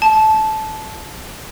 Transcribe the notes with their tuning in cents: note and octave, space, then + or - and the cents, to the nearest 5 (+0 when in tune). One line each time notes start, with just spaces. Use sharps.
A5 -15